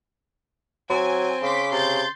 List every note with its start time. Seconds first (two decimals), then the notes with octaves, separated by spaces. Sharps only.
0.90 F#3 C4 G#5
1.43 C#3 C6 D6 B6
1.72 C3 C6 G6 A6